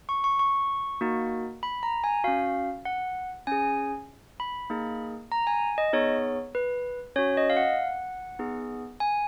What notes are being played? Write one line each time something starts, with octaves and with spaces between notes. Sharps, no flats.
C#6
C#6
C#6
A#3 D#4 F#4
B5
A#5
G#5
C#4 F#4 F5
F#5
C#4 G#4 G#5
B5
A#3 D#4 G#4
A#5
G#5
D#5
B3 D#4 G#4 C#5
B4
C#4 F#4 C#5
D#5
F5
F#5
B3 D#4 G#4
G#5